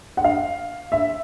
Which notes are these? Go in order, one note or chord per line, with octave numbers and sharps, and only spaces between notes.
F#5
F5
E5